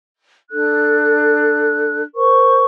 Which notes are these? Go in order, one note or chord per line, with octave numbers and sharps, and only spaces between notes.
D4 A4 F#6
A#4 C5 C#6